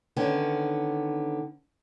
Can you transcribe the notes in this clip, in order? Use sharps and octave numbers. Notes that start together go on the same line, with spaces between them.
D3 D#3 B3 C#4